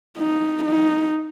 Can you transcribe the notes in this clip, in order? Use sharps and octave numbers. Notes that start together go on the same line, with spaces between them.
D#4
D#4